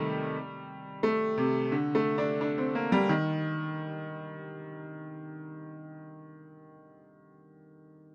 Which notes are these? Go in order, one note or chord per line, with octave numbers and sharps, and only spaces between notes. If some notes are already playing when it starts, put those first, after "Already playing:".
Already playing: C3 D#3 G3 A3
A3
C3
D3
A3
D4
D4
C4
A#3
G3
D#3